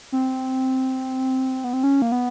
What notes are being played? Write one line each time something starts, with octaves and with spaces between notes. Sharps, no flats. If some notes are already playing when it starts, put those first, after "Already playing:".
C4
B3
C4
C#4
A#3
B3